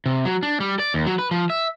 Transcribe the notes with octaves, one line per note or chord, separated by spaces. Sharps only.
C3
F#3
D4
G3
D5
D#2
F#3
B4
F3
E5